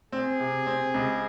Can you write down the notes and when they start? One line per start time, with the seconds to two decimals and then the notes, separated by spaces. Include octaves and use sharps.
0.12 C4 G#4
0.40 C3
0.67 C4
0.94 C#2